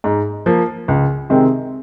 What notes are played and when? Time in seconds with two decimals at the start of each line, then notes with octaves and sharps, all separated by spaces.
0.04 G#2
0.46 F3 A#3
0.88 C#2
1.30 C3 D#3 G#3 C4